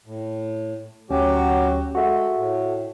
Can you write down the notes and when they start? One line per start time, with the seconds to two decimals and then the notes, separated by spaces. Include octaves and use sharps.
0.06 A2
1.10 D2 F#3 C#4 F#4 G4
1.95 G#3 F#4 A4 E5
2.36 A2